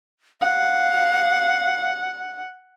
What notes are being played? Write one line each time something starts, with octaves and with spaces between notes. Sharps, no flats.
F5 F#5